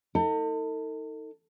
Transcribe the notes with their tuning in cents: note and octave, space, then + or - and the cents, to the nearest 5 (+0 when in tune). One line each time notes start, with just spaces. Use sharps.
D#4 +25 A4 +40